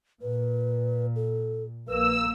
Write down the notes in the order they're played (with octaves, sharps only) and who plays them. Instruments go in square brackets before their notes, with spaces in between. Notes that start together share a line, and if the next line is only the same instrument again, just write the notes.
[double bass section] A#2 [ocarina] B4
[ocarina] A4
[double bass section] A#1 A#3 [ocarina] B4 [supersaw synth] E6